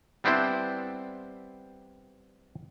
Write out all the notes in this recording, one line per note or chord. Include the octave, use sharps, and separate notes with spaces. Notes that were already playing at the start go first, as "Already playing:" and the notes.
G3 B3 C4 D4 E4 C5